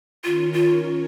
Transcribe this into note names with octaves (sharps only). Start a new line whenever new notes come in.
D#3 C#4 F4 A#4 C#5
F4